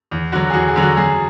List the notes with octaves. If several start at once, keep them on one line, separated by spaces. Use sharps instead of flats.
E2
D3 F#3 F#4
G#4
E2 F#4
G#4
D3 F#3
F#4
F#2 G#4